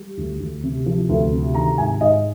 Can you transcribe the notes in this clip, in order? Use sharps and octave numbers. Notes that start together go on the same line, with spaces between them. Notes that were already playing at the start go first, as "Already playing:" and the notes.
Already playing: G3
D2
D2
C3
F3
D2
C3
D#3 A#5
G#2 G#5
G#2 D#5